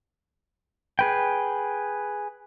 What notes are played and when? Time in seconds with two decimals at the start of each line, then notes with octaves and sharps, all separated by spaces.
0.99 G#4 B4 G5